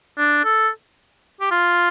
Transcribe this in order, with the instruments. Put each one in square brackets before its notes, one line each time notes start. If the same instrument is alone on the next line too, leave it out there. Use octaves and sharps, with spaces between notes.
[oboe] D4
A4
G4
F4